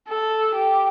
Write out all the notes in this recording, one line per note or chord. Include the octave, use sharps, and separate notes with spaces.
A4
G4